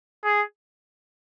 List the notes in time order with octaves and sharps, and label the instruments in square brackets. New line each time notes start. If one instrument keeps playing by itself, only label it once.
[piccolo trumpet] G#4